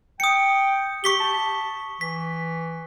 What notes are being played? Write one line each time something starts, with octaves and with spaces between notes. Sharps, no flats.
G5 D#6 C#7
G4 C#6 B6 G7
A5
E3 B6